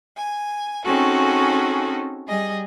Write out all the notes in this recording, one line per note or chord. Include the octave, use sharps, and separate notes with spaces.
G#5
C4 C#4 D#4 F#4 G#4 A4
G3 G#4 D#5